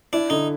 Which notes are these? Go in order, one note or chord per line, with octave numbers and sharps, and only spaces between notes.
D4 E4
D3 D#4